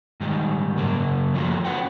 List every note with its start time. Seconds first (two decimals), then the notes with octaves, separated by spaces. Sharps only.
0.20 G#2 D#3 G3
0.77 F#2 C#3 A#3 A#4
1.34 F3 A3 A#3 F4 F#4
1.65 C#4 D#4 B4 F#5 G5